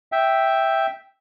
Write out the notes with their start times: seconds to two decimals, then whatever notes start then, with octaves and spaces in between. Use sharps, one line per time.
0.12 E5 G5